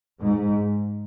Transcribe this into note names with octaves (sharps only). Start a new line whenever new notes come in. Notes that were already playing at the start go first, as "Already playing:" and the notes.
G#2